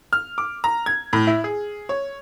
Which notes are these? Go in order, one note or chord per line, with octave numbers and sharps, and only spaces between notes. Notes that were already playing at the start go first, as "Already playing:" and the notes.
F6
D6
A#5
G#6
A2
E4
G#4
C#5